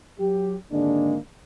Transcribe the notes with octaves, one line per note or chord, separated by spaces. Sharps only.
F#3 G4
G#1 D3 G#3 A#3 D4